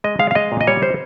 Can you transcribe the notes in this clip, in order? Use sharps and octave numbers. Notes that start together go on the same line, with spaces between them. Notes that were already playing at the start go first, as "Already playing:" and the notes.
G#3 D#5
G#3 F5
F5
G#3 D#5
A#2
D#5
G3 C#5
C5